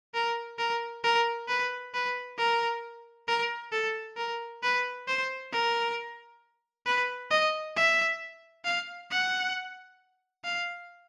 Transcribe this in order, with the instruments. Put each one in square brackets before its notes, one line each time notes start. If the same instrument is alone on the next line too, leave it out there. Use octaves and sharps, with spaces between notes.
[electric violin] A#4
A#4
A#4
B4
B4
A#4
A#4
A4
A#4
B4
C5
A#4
B4
D#5
E5
F5
F#5
F5